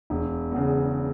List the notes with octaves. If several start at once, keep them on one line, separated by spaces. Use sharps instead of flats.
E1
E2 C#3